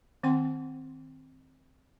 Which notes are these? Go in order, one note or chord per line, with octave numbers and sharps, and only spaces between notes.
D#3 C4 F#5 G5 C6